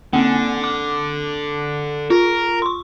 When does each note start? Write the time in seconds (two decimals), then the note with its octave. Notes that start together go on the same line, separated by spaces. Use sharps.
0.13 D3 A#3 C4
0.64 D6
2.10 F4 A#4
2.62 C6 C#6